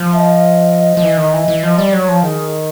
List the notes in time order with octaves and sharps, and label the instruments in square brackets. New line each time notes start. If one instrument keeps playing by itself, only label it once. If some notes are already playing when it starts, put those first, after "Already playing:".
Already playing: [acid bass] F3
[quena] E5
D#5
[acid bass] F3
E3
D#3
E3
E3
[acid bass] F3 [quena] D#5
[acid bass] G3 [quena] D5
[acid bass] F#3 [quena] C#5
[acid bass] F3
[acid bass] D#3 [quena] G#4